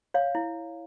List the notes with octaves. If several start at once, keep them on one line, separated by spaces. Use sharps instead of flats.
C#5 F5
E4